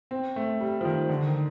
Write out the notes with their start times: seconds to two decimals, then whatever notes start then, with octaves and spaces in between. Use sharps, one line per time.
0.11 C4
0.36 A3
0.61 G3
0.81 F3
0.85 D#3
1.09 D3
1.26 D#3